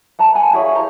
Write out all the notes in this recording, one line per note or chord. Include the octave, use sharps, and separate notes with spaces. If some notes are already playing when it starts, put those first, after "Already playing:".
F#5 A5 A#5
F#5 G#5 B5
E4 G#4 C#5 F5
C5 A#5